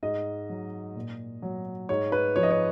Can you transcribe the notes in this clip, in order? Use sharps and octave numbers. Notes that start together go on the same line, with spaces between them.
G#2 D#5
F#3
A#2
F#3
G#2 C#5
B4
F3 C#5
D#5
C#5